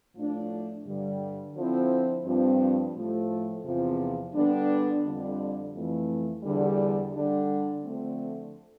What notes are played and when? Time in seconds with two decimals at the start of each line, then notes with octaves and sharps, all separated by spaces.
0.15 A2 F3 A3 D4
0.85 G2 D3 G3
1.54 D3 F3 C4 E4
2.25 G2 F3 C4
2.95 A2 F3 A3
3.64 E2 C3 F3
4.34 D3 G3 B3 D4
5.03 F2 D3 G3 D4
5.74 F2 E3 A3
6.43 E2 D3 G3
7.13 D3 G3 D4
7.83 D3 F3 A3 C4